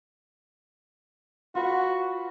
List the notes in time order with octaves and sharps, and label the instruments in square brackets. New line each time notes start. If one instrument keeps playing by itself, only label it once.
[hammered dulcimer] F4 B4 F#5 [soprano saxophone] F#4